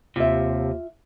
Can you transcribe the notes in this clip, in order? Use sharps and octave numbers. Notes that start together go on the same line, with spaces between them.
D#2 C3 F4 E5